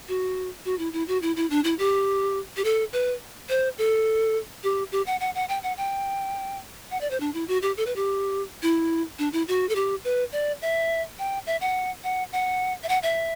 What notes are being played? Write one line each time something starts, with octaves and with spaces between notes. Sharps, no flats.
F#4
F#4
E4
E4
F#4
E4
E4
D4
E4
G4
G4
A4
B4
C5
A4
G4
G4
F#5
F#5
F#5
G5
F#5
G5
F#5
D5
C5
D4
E4
F#4
G4
A4
B4
G4
E4
D4
E4
F#4
A4
G4
B4
D5
E5
G5
E5
F#5
F#5
F#5
E5
F#5
E5